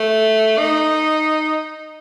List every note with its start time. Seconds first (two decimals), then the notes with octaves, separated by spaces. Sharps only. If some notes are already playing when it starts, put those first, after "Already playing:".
Already playing: A3
0.58 D#4